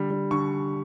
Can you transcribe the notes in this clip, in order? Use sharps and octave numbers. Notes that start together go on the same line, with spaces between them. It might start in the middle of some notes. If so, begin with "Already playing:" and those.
Already playing: D3 G3
G3
D3 C#6